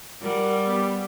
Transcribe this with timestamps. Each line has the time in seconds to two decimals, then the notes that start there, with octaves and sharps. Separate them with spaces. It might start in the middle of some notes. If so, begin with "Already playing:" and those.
0.22 G3 A#4 F#5
0.63 B3 G4